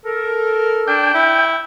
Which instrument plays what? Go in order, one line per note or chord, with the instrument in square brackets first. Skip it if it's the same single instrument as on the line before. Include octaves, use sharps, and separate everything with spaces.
[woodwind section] A4 A#4
[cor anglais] D4 [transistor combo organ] G5
[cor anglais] E4